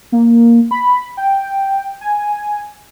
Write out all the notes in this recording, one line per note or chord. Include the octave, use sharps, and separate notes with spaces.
A#3
B5
G5
G#5